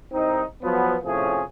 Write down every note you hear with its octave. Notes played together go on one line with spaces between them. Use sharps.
C2 C4 D#4
F3 F#3 B3
A2 C3 F3 C#4 G#4